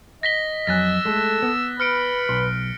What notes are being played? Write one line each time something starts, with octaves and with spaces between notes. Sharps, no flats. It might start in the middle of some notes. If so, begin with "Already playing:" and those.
D#5 A#6 B6 G7
F2 F#3 G#5 E6 F#6 A6 A#6
G#3 A3 A4
B3
B4 B5 F6 C#7 D7
B1 C6